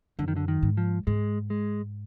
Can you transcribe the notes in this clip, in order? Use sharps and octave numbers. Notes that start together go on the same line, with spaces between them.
F#2 D3
D#3
D3
D#3
G#2
F3
G#2 G#3
G#3